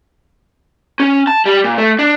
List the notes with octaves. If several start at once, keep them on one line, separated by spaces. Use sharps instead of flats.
C#4
A5
G3
A#2
A3
D4